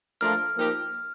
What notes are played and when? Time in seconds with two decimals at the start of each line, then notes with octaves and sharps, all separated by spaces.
0.21 F3 A3 D4 F4 A#4 F6
0.56 F3 A#3 D#4 G4 A#4